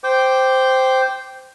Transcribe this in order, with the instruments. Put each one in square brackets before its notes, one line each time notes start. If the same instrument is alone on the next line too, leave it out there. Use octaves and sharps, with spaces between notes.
[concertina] C5 G5 D6